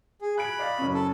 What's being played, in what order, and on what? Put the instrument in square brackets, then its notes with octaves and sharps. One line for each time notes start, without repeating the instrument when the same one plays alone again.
[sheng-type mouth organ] G#4
[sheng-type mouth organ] B5 [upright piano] F#6 G#6 D7
[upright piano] D5 D#5 F5
F#1 C#4
[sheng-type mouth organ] A4